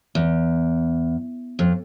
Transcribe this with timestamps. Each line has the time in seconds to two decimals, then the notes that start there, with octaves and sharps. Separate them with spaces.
0.15 E2
1.59 F2